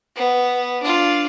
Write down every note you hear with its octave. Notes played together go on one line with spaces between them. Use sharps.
B3
D4 F4